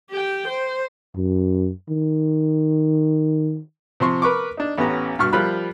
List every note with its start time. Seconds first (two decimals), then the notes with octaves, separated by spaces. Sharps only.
0.10 G4 G5
0.48 C5
1.15 F#2
1.89 D#3
4.00 C3 F3 C6 C#6
4.22 A#4 B4 C#6 D6
4.57 D4 D#4
4.78 A1 B3 C#4 G4 A#5
5.19 G2 B2 C#6 F6
5.33 F3 G3 F4 A#4 B5 F#6